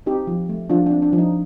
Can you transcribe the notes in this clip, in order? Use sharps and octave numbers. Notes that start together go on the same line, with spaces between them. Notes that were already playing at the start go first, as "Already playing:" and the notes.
C4 D#4 G4
F3
A3
F3 D4 F4
D4
C4
D4
F3
D#4